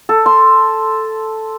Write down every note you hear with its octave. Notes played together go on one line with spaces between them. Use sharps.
A4
C6